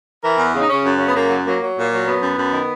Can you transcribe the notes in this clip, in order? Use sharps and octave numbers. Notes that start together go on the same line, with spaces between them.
E3 A#4
E2
C#3
D#4
C#3 C#4
F#2
C#3 C#4
B3
F#2 A#3
F#3
F#3 A#3
F#3
A#2 A#3
F#3
F#2 B3
F#2
F#2
D#3